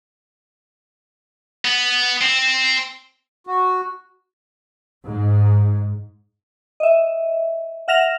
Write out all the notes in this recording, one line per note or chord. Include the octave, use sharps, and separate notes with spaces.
B3
C4
F#4
G#2
D#5 E5
E5 F#5 F6 A#6 E7 F7